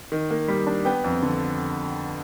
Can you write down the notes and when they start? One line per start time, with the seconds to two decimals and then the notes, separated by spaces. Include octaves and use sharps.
0.12 D#3
0.31 A#3
0.48 G3
0.67 D4
0.85 B3 G5
1.04 F2
1.23 D3